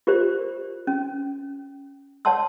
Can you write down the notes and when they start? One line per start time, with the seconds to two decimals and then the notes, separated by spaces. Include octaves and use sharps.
0.07 F4 G4 A#4 C5 D5
0.87 C#4
2.25 C#5 D5 F#5 A5 C6 E6